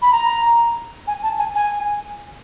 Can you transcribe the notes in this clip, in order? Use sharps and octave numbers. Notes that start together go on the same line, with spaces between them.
B5
A#5
G#5
A5
G#5
G#5